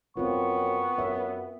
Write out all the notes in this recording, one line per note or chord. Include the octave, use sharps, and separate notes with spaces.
F#2 B3 C4 F4 C#6
F#2 E5